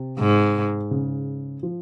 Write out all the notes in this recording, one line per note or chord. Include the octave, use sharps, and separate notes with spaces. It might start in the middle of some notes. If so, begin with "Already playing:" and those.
Already playing: C3
G#2
C#3
F3